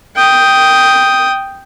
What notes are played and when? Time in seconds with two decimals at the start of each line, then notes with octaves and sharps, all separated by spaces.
0.16 G5 D#6